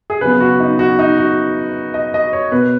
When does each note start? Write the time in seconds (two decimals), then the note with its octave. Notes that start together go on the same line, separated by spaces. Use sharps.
0.10 G#4
0.21 C#3 F#3 B3 B4
0.40 F#4
0.60 D#4
0.79 F#4
0.99 D#4
1.17 F#4
1.94 D#5
2.14 D#5
2.33 C#5
2.52 B2 B3 B4